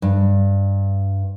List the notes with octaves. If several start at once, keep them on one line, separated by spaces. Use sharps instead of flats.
G2